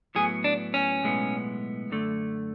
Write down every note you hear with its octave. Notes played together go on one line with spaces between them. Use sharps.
A2 F#3 B3 G#4
D4
C#4
B1 A2 G#3 B3
F#2 D3 A3